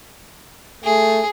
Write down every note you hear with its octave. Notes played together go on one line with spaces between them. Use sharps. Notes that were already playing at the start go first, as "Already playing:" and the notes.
A3 G#4